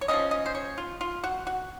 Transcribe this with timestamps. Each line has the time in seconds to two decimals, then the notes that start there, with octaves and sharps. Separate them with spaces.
0.01 C#5
0.08 F3 A#3 C#4 D#5
0.31 D#5
0.46 C5
0.55 C#5
0.78 F4
1.01 F4
1.24 F#4
1.47 F#4